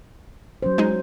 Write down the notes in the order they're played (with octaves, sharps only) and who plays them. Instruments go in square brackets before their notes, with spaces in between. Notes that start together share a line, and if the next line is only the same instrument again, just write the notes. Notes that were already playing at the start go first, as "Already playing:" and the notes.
[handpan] F#3 C#4 C5
[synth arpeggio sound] G#3 D#4